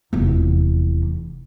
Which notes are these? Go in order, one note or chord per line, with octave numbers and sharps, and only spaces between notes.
F1 E2